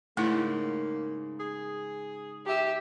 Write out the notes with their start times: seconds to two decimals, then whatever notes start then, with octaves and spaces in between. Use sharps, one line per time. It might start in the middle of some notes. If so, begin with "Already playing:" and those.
0.17 G#2 C#3 A3 A#3 E4
1.40 G#4
2.46 G4 E5